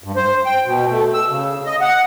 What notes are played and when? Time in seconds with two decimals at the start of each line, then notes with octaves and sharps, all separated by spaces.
0.04 G2
0.16 C5
0.46 G5
0.65 B2
0.89 A3
1.14 E6
1.29 C#3
1.66 D#5
1.81 F#5